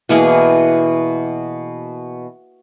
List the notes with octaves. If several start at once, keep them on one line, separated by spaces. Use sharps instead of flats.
B2 E3 A#3 G#4